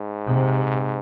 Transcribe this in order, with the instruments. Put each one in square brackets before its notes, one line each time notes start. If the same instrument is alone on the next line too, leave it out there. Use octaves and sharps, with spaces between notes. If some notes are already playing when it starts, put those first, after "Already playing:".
Already playing: [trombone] G#2
[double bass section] C3